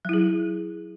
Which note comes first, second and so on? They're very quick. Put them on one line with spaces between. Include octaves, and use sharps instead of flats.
F#3 E4 G#4